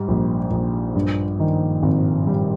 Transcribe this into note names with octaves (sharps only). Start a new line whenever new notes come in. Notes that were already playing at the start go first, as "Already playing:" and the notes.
Already playing: G#2 G3
A#1
A#1
G2
D#3
G#1
G3